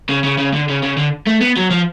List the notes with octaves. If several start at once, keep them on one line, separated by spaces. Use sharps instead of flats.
C#3
C#3
C#3
D3
C#3
C#3
D3
A3
B3
F#3
F3